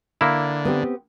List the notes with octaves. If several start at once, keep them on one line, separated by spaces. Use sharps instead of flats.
D3 A#3 E4
B3 C4 G4